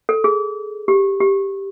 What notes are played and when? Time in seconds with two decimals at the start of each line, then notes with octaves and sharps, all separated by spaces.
0.09 A4
0.24 G#4
0.88 G4
1.20 G4